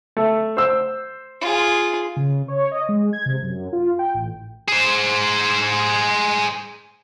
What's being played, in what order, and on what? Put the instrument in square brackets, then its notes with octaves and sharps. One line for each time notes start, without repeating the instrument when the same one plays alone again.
[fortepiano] A3
C5 E6
[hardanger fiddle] F4 G#4
[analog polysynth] C#3
C#5
D#5
G#3
G#6
C3
F#2
F4
G5
A1
[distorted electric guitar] G#4 C5